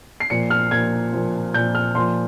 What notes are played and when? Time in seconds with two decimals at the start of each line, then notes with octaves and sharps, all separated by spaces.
0.20 C7
0.30 A#2 F3 C#7
0.50 F6
0.71 A#2 F3 G#6
1.12 A#2 F3
1.54 A#2 F3 G6
1.75 F6
1.95 A#2 F3 C6